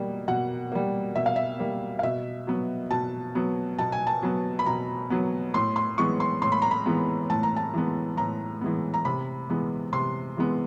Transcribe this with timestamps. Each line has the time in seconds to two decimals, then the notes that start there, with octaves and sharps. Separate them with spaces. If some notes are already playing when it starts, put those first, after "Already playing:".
Already playing: B2 G3 A#3
0.28 B2 F#5
0.72 G3 A#3
1.16 B2 E5
1.26 F5
1.36 E5
1.59 G3 A#3
1.99 F5
2.03 B2 E5
2.47 F#3 B3
2.91 B2 A5
3.35 F#3 B3
3.79 B2 A5
3.92 G#5
4.07 A5
4.22 F#3 B3
4.59 B5
4.66 B2 A#5
5.10 F#3 B3
5.54 A2 C6
5.76 C6
5.98 E3 G#3 B3 C#6
6.20 C6
6.42 A2 C6
6.52 B5
6.62 A#5
6.71 B5
6.86 E3 G#3 B3
7.30 A2 A5
7.43 A#5
7.56 A5
7.73 E3 G#3 B3
8.17 A2 A#5
8.61 E3 G#3 B3
8.94 A#5
9.05 C3 B5
9.49 E3 G#3 B3
9.93 C3 C6
10.37 E3 G#3 B3